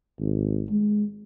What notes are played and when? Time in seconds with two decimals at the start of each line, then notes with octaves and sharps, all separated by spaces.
0.20 G#1
0.70 G#3